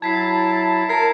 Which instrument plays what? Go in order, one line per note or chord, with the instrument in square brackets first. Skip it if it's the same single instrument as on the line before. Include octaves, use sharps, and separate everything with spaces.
[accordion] F#3 E4 [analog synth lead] A5 [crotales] G#6 B6 C7
[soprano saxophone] A#4 [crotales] G#6 C7